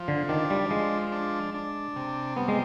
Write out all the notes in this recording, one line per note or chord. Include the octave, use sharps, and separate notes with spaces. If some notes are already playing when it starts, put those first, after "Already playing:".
Already playing: F3
D3
D#3 D4
G3
F3 G#3
D4
D4
C3
G3 B3
G#3